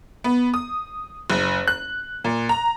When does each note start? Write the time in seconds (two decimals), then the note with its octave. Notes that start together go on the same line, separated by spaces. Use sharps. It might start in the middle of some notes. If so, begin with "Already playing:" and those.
0.24 B3
0.54 D#6
1.30 F#1
1.68 F#6
2.24 A#2
2.49 A#5